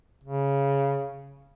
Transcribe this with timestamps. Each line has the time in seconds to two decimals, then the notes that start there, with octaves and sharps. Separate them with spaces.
0.24 C#3